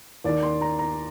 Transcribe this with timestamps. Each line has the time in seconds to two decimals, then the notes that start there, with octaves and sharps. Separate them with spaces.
0.24 D#2 D#3 D5
0.43 C6
0.61 A#5
0.79 A#5